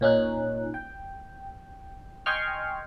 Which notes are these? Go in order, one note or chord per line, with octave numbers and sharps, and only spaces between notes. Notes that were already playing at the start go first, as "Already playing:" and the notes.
A#2 C#4 D#4 F#6
G5
D#5 G5 G#5 C6 C#6 F6